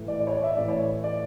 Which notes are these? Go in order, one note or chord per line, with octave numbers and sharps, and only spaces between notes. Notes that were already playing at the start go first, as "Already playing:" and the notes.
Already playing: A2 E3
D5
D5
C#5
D5
E5
A2 E3 D5
C#5
D5